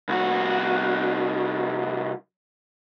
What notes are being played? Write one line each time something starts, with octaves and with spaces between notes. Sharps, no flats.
C2 F#4